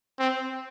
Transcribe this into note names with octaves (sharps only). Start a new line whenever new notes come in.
C4